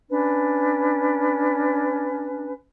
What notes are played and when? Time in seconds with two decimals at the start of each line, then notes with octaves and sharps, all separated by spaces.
0.09 C#4 D4 B4